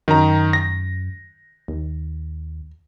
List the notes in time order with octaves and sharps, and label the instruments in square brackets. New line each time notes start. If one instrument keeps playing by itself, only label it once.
[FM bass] F#2 [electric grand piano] D#3 A#5
[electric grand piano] A#6
[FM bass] D#2